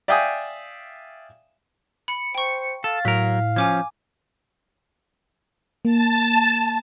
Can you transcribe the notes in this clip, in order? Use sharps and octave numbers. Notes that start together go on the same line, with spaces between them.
D5 E5 F5 G5 G#5 D#6
B5 C#7
C5 G5 C#6
A4 F5 A6
A2 F#3 A#4 B6
F3 C#4 G#5 D6 G#6
A#3 A5